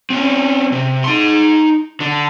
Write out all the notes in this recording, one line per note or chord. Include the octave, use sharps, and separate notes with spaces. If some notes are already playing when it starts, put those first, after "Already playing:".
C4 C#4
C3
D#4 C6
D3